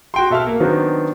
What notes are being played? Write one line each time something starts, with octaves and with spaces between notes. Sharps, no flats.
F#4 G5 C6
B2 A4 E5 F5 F6
A#3
D#3 F#3 B3 C4 D4